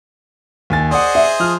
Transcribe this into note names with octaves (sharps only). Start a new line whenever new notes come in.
D#2 G#5 A6
G#4 C5 D5 D#5 F#5
E5
F3 F6